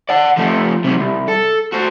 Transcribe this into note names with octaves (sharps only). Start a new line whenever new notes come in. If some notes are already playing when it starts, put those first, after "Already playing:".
D5 F#5
F3 A3
C3 F#3
C2
A4
F#4 C5